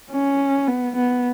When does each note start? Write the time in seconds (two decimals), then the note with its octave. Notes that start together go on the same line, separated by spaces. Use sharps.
0.11 C#4
0.67 B3
0.96 B3